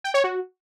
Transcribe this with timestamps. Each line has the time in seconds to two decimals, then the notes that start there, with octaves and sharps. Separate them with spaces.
0.04 G5
0.14 C#5
0.24 F#4